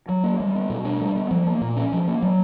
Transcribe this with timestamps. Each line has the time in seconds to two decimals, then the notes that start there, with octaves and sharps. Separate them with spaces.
0.09 F#3
0.24 A#3
0.40 G3
0.55 B3
0.70 B2
0.85 D4
1.01 G3
1.16 B3
1.31 F3
1.47 A#3
1.61 A#2
1.77 C#4
1.92 F3
2.08 A#3
2.22 F#3